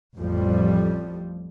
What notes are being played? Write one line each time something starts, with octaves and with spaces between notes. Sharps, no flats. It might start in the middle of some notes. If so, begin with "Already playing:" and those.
A1 F2 F3 G3